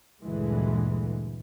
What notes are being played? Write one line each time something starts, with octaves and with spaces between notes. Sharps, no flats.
D2 G2 A#2 D3 E3 G#3